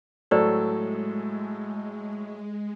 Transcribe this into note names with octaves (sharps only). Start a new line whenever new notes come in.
A2 F#3 G#3 A4 C5 D5